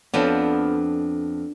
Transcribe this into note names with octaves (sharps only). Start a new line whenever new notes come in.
F2 F3 B3 D4